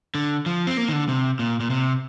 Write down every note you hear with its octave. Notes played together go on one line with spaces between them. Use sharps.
D3
F3
C4
A#3
D#3
D3
C3
A#2
A#2
C3